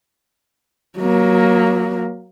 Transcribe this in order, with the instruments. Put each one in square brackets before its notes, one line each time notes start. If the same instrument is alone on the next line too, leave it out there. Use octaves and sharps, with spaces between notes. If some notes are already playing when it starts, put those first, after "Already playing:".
[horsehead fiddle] F#3 A#3